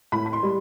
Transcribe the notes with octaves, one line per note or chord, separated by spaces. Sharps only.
A2 B5
B5
C6
G3